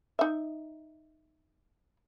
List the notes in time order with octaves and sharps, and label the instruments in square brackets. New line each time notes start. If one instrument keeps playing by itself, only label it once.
[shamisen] D#4 E5